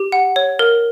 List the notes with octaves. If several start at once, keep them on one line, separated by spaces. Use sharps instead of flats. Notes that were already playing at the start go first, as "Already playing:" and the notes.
Already playing: G4
F#5
C#5
A#4